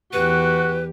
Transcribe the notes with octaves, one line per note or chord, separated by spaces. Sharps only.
E2 F#4 G4 B4